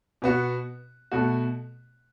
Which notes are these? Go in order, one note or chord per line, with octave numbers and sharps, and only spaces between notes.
B2 B3 F#4
B2 A3 F#4